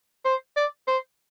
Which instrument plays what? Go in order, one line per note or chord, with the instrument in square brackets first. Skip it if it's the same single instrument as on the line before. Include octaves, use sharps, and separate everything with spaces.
[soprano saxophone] C5
D5
C5